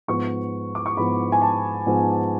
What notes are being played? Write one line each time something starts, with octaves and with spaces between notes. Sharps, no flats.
G#2 F3 B3 C#6
D6
C#6
G#2 F3 B3 B5
G#5
A5
G#2 F3 B3